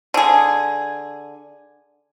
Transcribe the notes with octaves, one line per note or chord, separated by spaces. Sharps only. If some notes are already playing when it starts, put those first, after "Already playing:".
D3 G#4